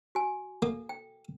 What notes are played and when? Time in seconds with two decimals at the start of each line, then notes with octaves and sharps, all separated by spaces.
0.15 F#4 G#5
0.62 A#3 A4
0.89 G5